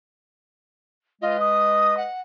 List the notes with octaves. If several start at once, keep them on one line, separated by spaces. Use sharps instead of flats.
G#3 F4 B4 D#5
D#6
F#5